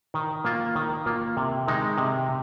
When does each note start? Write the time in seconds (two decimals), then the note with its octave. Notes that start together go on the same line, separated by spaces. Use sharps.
0.14 D#3
0.44 A#3 F4
0.75 D#3
1.06 A#3 F4
1.37 C3
1.68 D#3 G#3 D#4
1.98 C3